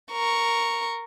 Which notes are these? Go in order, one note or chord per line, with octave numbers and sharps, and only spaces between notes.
A#4 C#6